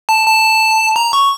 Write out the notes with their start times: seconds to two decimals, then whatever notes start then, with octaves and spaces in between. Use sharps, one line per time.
0.09 A5
0.27 A5
0.96 A#5
1.13 C#6